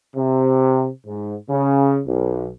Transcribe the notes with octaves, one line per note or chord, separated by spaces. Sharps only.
C3
G#2
C#3
B1